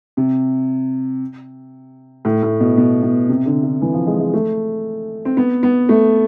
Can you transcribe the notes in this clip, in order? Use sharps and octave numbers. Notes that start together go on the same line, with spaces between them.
C3
A2
A2
B2
B2
B2
C3
D3
D3
E3
F3
G#3
G#3
A3
C4
B3
B3
A3